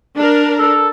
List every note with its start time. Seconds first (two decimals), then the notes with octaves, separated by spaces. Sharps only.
0.16 D4 A#4
0.59 A4